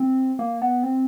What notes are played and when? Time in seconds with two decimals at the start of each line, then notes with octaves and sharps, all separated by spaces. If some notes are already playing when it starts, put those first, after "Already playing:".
Already playing: C4
0.39 A#3
0.62 B3
0.83 C4